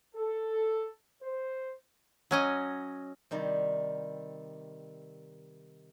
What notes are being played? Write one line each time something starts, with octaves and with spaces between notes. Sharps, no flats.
A4
C5
F#3 C#4 D#5
C3 D#3 G3